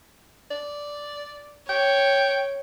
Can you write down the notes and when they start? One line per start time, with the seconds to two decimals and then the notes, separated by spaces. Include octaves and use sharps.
0.51 D5
1.69 C#5 G5